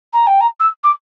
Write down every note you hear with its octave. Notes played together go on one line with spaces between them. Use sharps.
A#5
G5
A#5
E6
D6